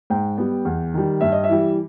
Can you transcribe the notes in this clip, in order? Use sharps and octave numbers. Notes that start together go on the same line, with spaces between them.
G#2 G5
G3 B3
E2
D#3 G3
G2 E5
D#5
E5
E3 G3